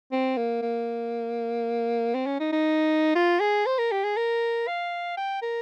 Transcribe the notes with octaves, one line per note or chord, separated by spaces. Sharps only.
C4
A#3
A#3
C4
C#4
D#4
D#4
F4
G#4
C5
A#4
G4
G#4
A#4
F5
G5
A#4